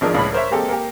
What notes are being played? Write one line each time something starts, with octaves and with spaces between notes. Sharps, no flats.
G#1 F3 D4 G#4 A#4
C#2 A2 B5
A#4 C5 C#5 E5
G#3 A#3 C4 G4 A4
A#3 G4